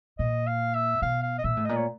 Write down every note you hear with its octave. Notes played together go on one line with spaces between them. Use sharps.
A#2 D#5
F5
E5
B2 F5
F5
D#5
A#2 E5
A2
A#2 D#5
C#5